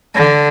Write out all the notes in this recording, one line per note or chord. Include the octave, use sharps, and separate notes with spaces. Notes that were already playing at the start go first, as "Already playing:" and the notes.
D3